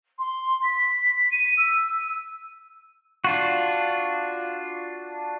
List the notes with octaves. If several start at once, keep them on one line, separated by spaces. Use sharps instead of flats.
C6
B6
B6
D#7
E6
D4 F4 F#4